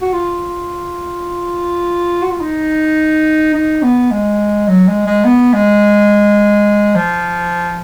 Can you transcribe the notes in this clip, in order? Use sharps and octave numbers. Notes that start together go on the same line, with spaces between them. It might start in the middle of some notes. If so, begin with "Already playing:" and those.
F#4
F4
F#4
F4
D#4
D#4
B3
G#3
F#3
G#3
G#3
B3
G#3
F3